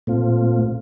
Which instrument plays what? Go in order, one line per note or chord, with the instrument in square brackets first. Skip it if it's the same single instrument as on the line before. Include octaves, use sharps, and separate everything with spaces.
[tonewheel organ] A#2 A3 C4 F4